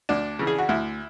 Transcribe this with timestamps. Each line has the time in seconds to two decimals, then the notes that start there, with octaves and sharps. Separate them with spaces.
0.09 D2 D4
0.39 C#3 E3
0.47 G#4
0.58 F#4
0.69 D2 E4